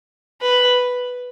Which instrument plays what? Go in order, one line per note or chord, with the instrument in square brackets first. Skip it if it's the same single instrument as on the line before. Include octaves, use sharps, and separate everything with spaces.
[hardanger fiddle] B4